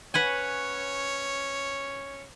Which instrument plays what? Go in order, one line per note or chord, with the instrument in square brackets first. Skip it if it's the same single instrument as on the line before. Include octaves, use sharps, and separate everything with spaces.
[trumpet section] C#4 C#5 [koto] B4 F#5 G#5